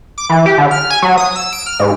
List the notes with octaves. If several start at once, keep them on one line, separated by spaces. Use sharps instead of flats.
D6
E3
G4
D3
F6
G#5
F#3
D#6
E6
D7
F6
G#2